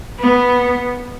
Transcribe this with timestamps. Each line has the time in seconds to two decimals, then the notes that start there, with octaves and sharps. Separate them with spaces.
0.20 B3